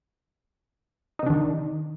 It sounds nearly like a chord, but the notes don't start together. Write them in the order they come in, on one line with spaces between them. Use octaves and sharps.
D#4 C3 D4 D#3